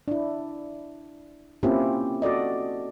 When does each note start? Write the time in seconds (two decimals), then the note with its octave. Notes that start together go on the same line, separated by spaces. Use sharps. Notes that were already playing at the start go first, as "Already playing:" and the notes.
0.08 D4 E4
1.63 A#3 C4 C#4 E4 F4 G4
2.22 F#4 A4 D5 D#5